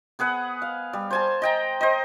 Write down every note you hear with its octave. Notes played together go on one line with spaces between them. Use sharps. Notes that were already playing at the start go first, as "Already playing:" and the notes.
B3 G#4 B4 F#5
F5
G3
C5 G#5 A5
D#5 G5 A#5
C5 D#5